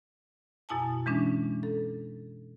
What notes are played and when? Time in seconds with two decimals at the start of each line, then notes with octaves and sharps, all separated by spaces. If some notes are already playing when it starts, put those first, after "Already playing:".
0.69 F#2 B2 E4 G#5 A5
1.06 E3 G#3 C#4 D4
1.63 A4